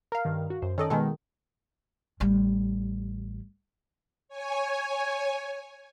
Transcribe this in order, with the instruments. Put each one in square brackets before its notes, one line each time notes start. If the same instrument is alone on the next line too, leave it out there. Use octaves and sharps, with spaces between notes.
[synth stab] A#4 F5
[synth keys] G2 D#3
F#4
F#2 C5
[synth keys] D#3 D5 [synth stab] C#4 A4 D#5
[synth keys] B2 D#3 [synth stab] G#3 B3 A4
[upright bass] A1 G3
[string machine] C#5 G#5